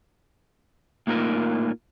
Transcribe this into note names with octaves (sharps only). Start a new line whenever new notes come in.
A2 A#3 D#4 F4 A#4